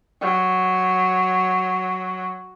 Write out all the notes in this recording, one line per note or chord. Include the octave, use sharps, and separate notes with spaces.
F#3